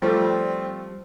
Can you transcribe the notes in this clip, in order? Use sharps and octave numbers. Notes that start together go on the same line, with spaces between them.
F3 G3 A3 C4